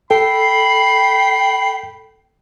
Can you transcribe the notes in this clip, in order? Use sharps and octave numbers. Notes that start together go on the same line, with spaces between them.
A4 G5 B5 C7